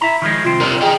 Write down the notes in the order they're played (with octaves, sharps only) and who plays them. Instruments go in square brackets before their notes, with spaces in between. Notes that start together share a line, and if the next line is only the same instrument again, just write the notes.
[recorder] E4 [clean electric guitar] E5 A#5
[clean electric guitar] D#3 F3 G#3
[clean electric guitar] C2 C4 [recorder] F4
[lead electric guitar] G3 A#4
[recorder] G#4 [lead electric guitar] D#5 G5